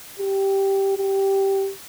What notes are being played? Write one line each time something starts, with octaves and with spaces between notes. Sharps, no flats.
G4
G4